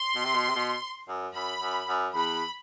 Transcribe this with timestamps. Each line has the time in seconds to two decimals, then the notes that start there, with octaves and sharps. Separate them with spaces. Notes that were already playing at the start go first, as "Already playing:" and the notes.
Already playing: C6
0.15 B2
0.24 C3
0.34 B2
0.48 C3
0.55 B2
1.08 F#2
1.34 F#2 B5
1.61 F#2
1.88 F#2
2.15 E2 B5